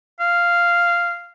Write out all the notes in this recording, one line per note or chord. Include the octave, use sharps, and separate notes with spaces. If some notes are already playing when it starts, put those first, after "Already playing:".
F5